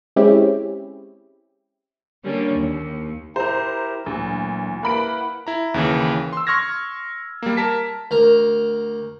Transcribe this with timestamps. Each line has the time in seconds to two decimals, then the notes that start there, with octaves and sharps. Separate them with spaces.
0.16 G#3 C4 C#4 E4 G4
2.24 D3 G3 A#3 C#4 D4
2.55 D#2
3.36 E4 G4 A#4 C5 A#5
4.06 D2 A#2 E3 F#3
4.83 A#3 E4 B4 F#5 B5 D7
5.47 E4 A#5
5.74 D#2 C#3 E3
6.33 C6 E6
6.47 C6 C#6 F6 G#6 A#6
7.42 G3 A#3
7.57 A#4 A5 B6
8.11 D2 A#4 A#5